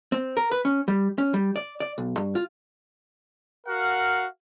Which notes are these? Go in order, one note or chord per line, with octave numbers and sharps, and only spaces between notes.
C4
A#4
B4
C#4
G3
C#4
G3
D5
D5
B1
G2
F4
F#4 A#4 F5 F#5